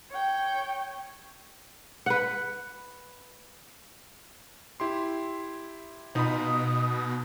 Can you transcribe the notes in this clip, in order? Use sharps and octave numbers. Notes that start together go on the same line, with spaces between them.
C#5 G5
B4 F#5
E4 G4 C6
B2 D#4 F4 B5 D#6